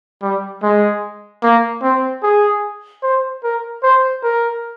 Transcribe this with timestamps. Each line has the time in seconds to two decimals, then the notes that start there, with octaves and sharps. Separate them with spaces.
0.22 G3
0.62 G#3
1.43 A#3
1.83 C4
2.23 G#4
3.03 C5
3.44 A#4
3.83 C5
4.24 A#4